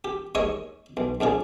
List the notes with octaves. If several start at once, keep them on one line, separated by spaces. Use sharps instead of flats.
G4
D#2 G#2 C#5 D#5 C#6 D#6
B1
A#1 F2 A#2 G#4